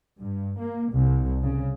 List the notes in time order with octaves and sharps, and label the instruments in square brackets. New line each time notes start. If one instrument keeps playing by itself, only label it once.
[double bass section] G2
A#3
C2
C#3